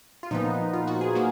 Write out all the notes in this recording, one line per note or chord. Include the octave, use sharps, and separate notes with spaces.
F4
A#2 F3 B3 D#4
F4
F#4
G#4
F#3 A#3